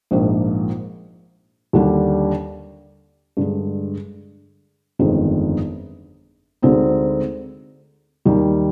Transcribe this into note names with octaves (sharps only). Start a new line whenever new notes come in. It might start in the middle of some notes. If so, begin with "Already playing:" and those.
A#1 G#2 F3 A#3 F4
D#2 D3 G3 D4
G2 D3 G#3
G1 F2 D#3 G#3
D2 D3 G#3 C4 D#4
D#2 D#3 G3